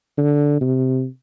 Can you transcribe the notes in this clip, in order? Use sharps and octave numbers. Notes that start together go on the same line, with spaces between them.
D3
C3